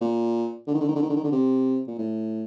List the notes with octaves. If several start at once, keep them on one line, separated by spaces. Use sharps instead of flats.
A#2
D3
D#3
D3
D#3
D3
D#3
D3
D#3
D3
C3
A#2
A2